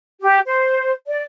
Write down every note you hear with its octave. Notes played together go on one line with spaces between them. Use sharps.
G4
C5
D5